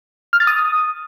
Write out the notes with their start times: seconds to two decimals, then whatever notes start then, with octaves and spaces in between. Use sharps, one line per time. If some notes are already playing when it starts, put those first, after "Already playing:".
0.33 F6
0.40 A6
0.47 D#6